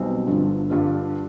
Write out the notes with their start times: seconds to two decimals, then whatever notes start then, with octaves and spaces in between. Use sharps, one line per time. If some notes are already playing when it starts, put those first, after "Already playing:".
Already playing: B1 B2 G3 C4
0.27 G1 G2 D3 F3
0.70 G2 D3 G3 D4 F4